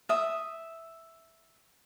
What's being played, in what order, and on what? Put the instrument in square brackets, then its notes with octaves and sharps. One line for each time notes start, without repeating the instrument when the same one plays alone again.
[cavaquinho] E5 D#6